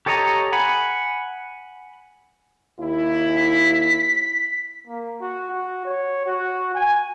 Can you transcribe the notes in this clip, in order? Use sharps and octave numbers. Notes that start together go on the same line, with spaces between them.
G4 A4 C#5 D#5 A#5
F#5 G#5 B5
D#2 E4
B6
A#3
F#4
F#4
C#5
F#4
G#5